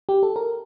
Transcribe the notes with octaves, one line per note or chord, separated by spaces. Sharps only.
G4
A4
A#4